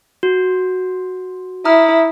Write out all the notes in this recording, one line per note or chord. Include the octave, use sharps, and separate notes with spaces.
F#4
E4 A#5 D#6 F6